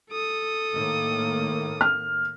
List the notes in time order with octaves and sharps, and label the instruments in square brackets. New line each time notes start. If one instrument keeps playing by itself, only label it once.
[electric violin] A4 D#6
[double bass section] A2 D#3 A#3
[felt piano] F6